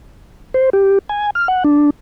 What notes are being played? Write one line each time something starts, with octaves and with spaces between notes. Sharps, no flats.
C5
G4
G#5
F6
F#5
D4